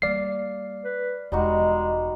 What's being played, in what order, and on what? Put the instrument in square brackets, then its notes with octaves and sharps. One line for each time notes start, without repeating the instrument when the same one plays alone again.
[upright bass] G3 A#3 [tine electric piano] D5 C7 [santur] F5
[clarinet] B4
[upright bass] E1 [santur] G3 D#4 F#4 [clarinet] G#3